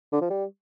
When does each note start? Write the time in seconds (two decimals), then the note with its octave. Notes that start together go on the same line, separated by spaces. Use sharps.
0.12 D3
0.21 F3
0.30 G3